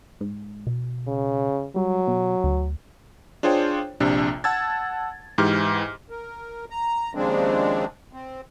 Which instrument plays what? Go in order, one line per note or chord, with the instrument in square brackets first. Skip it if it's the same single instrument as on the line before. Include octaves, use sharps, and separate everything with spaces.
[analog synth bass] G#2
B2
[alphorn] C#3
[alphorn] F#3 [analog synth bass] G3
[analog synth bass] B2
D2
[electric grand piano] D4 F4 G#4 C5 C#5 G5
A#1 C3 D4
F#5 A5 E6 G#6 A6
G#2 E3 G4 F6
[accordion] A#4
A#5
D#2 C#3 F3 G#3 C4 D4
C4